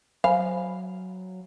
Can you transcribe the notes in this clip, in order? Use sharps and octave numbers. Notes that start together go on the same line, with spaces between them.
F#3 C5 F5 G#5 B5